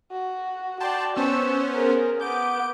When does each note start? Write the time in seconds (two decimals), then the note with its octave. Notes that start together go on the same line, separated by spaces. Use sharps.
0.12 F#4
0.80 F#4 D5 G5 A5 C6
1.16 B3 C#4 C5 C#6 E6
1.74 G#4 A#4
2.21 B3 D6 G6 D7